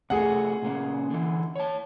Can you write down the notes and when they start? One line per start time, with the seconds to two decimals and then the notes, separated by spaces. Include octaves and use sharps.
0.10 C3 A3 F#4 G#4 F#5
0.62 A#2 C#3 A#3
1.10 D3 E3
1.56 C#5 A5